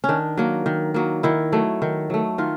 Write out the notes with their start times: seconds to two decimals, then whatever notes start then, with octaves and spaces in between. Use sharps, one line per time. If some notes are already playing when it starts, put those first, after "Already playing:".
0.04 C#4
0.09 D#3 D4
0.37 F#3 A#3
0.66 D#3
0.94 F#3 A#3
1.23 D#3 E4
1.52 F#3 A3
1.82 D#3
2.10 F#3 A3
2.38 D#3 F4